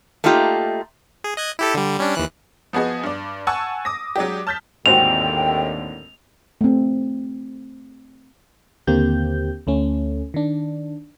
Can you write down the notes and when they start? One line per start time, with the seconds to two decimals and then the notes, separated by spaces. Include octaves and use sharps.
0.24 A3 A#3 D#4 F4 G4
1.24 G#4
1.37 D#5 F#6 G#6
1.59 E4 G4 A4
1.74 D3 G3
1.98 G3 C#4 D4
2.15 D#2 E3 F#6
2.73 F3 B3 F#4 G#4 D#5
3.03 G2 D5
3.47 F#5 G#5 A5 C#6 E6
3.85 D6 D#6 A#6
4.16 F#3 G#3 D4 G4
4.47 A5 F6 G6 A6 B6
4.86 G#1 D#2 A2 D3 C4 F#4 G5 F7
6.61 A3 C4
8.87 D#2 D3 A#3 C4 G4 G6
9.67 D2 A3 C#4
10.34 D#3 D4